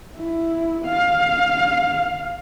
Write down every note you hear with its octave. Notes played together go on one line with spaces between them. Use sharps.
E4
F5